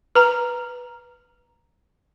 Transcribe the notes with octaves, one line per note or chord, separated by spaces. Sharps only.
B4 A#5